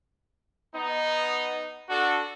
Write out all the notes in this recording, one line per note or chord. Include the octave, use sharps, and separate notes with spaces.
B3 D#4
D4 F#4 A4